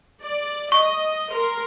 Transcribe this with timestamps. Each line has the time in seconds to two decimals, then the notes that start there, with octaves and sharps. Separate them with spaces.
0.22 D5
0.72 D#5 C#6
1.31 A#4 C6